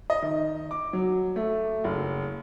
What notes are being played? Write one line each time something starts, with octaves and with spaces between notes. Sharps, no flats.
D#5
D#3
D6
F#3
A3
F#1